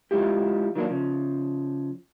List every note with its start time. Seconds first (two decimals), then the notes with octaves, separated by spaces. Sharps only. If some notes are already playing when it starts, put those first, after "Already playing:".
0.11 F3 G#3 E4 F4 G4
0.75 D#3 F#3 A#3 D4
0.89 C#3 F3